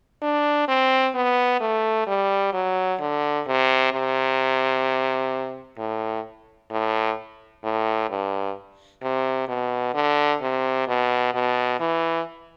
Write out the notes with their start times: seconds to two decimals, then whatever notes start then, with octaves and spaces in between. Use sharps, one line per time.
0.22 D4
0.68 C4
1.15 B3
1.61 A3
2.07 G3
2.53 F#3
3.00 D3
3.47 C3
3.92 C3
5.79 A2
6.71 A2
7.64 A2
8.10 G2
9.03 C3
9.48 B2
9.94 D3
10.41 C3
10.88 B2
11.34 B2
11.80 E3